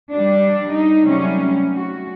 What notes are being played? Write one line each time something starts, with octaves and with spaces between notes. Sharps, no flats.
G3 D4
D#4
C3 F#3 G3 A3 C#4
F#4